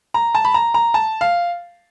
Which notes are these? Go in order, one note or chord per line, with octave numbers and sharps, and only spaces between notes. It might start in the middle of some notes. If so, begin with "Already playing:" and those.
A#5
A5
B5
A#5
A#5
A5
F5